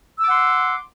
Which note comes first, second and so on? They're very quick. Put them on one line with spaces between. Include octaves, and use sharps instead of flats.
E6 D6 F#5 C6